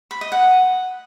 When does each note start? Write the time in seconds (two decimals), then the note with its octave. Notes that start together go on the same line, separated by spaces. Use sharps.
0.11 B5
0.21 D#5
0.32 F#5